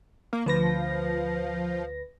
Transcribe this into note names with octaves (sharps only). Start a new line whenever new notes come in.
A#3
D2 F3 B4 A#6